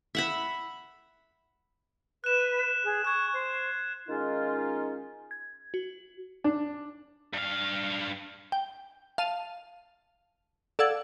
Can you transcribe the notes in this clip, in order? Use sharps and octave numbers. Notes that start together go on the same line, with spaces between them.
E5 F#5 B5
B4 F#6 E7
G#4
C#6 F#6 G#6
C5
D#3 G#3 C#4 D#4 F4
G#6
F#4
D4
G2 F5
G5
F5 A5 D#7
A4 D5 F5 F#5 E6 G#6